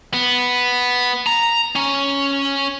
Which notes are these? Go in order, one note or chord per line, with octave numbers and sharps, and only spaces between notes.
B3
A#5
C#4